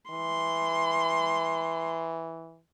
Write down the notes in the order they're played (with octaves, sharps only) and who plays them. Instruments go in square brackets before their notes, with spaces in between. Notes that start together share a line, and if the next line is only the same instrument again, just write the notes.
[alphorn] E3 [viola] C6